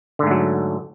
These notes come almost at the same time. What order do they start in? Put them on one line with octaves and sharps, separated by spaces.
D3 G#2 A3 F#3